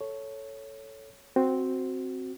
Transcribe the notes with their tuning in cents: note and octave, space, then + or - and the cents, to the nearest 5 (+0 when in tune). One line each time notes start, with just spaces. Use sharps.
A4 +0 C#5 +0
C4 +0 F#4 +0